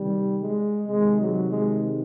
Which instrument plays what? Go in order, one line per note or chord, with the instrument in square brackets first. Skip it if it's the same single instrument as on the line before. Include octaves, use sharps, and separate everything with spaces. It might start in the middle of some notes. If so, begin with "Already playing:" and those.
Already playing: [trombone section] C3 D#3 G3
G#3
C3 D#3 G#3
F#3
G#3